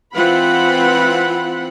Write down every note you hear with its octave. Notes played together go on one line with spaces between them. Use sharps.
E3 C4 F4 F#5 B5